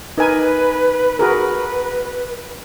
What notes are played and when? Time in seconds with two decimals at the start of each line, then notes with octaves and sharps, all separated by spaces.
0.18 D#4 A#4 B4 G#5
1.19 F#4 G#4 A#4 B4